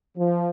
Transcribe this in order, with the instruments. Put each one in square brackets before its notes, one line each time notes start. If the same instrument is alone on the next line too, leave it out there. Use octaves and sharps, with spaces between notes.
[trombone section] F3